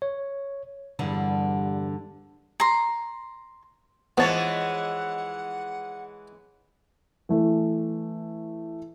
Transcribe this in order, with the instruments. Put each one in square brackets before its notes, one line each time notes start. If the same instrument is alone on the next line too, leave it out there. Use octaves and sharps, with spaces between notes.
[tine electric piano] C#5
[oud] E2 G2 D3
[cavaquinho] A#5 C6
[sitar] E3 G#3 C#5 [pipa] F3 A5 [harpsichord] B3 [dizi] F#5
[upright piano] E3 A3